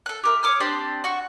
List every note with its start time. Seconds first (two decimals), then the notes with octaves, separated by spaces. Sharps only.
0.06 A4 F#6
0.24 G4 A#4 E5
0.43 C#5 D6 D#6 F6
0.60 C4 D4 G4 C5
1.04 F#4 C#6